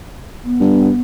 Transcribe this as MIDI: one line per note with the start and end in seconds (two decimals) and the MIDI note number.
0.45 1.01 59
0.60 0.90 43